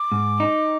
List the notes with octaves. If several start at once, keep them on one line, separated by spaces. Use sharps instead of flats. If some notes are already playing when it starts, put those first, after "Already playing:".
Already playing: D6
G#2
D#4